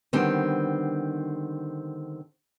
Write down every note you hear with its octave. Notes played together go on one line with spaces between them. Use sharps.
D3 D#3 G3 B3 C4